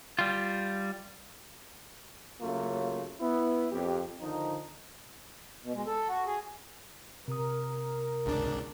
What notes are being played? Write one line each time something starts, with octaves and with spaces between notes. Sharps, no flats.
G3 F4
C#3 F#3 A3 A#3 F4
B3 E4
F2 G4
D3 D#3 F3 D#4
B2
G#3
A4
F#4
G#4
C3 A#4 D#6
G#1 C#2 D4